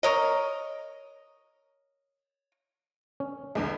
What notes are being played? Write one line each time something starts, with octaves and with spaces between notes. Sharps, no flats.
A#4 C#5 D#5
C#4
B1 E2 D3 G#3